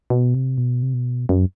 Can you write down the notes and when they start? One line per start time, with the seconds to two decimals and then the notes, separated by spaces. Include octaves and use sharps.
0.10 B2
0.35 C3
0.58 B2
0.83 C3
0.94 B2
1.29 F#2